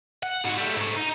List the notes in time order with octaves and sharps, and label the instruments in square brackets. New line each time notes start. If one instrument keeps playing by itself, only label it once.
[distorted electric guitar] F#5
G#2 F#4
G3 A3
G#2 A3
D#4